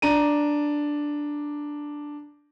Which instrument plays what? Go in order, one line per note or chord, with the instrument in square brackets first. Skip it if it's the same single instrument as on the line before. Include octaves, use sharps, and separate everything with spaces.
[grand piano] D4 A#5 D#7